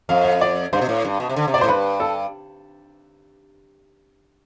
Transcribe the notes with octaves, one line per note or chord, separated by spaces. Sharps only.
F2 F5
F5
D5
G2 C5
B2
A2
G2
B2
C3
D3
C3
D5
B2
A2 C5
G2 B4
A4